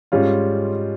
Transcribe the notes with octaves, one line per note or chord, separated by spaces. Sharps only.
G#2 G3 C#4 F4